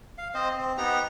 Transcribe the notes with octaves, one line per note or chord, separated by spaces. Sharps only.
F5
C4 C5 D#5
C4
B3 D#4 G4 A#5